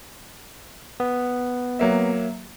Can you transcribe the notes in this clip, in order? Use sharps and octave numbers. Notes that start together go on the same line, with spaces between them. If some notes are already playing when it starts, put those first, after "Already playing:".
B3
F#3 A#3 E5